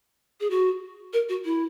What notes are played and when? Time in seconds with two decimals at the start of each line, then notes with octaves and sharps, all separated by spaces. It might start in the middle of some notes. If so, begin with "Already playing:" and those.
0.40 G#4
0.50 F#4
1.13 A#4
1.29 F#4
1.45 E4